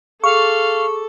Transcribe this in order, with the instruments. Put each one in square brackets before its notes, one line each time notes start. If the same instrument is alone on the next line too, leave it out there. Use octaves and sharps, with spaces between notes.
[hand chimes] G#4 D6 [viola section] A4 [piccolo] F5 [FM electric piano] C#6